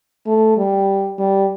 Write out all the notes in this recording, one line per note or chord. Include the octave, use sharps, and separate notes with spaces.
A3
G3
G3